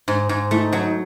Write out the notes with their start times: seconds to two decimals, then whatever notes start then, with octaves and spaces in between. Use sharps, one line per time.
0.08 G#2
0.29 G#2
0.51 A3 D#4 E4
0.72 F#3